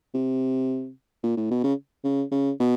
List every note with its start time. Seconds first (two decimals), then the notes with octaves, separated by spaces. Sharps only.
0.14 C3
1.23 A#2
1.37 A2
1.51 B2
1.64 C#3
2.04 C#3
2.32 C#3
2.60 B2